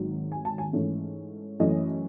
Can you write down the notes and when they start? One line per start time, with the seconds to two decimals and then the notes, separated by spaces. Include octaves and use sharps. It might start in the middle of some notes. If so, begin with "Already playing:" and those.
Already playing: G#1 G#2 D#3 F#3
0.32 G#5
0.45 A5
0.58 G#5
0.73 G#2 E3 A3 C#4
1.60 F#2 E3 A3 C#4 D#5